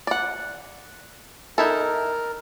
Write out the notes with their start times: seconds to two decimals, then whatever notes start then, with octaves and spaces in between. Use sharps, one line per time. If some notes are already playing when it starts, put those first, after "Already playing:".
0.07 D5 F#5
1.58 D#4 E4 A4 A#4